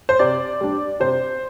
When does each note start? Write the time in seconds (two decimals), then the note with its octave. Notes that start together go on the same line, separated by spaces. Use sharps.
0.09 C5
0.19 C3 D5
0.61 G3 D4
1.00 C3 C5